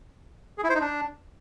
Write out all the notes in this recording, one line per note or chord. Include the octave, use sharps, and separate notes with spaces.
G#4
E4
C5
D#4
D4